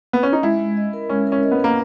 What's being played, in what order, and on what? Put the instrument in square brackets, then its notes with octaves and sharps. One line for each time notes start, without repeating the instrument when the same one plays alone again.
[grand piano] B3
C#4
D#4
[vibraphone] G#3 [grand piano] E4
[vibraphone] G#3
D#5
A#4
[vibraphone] G#3 [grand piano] C#4
[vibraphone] A#4
[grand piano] C#4
[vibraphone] D#5
[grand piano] B3
[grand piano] A#3 [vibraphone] A#4